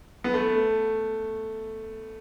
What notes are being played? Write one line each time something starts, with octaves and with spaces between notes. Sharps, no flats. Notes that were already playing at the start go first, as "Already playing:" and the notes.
B3
A3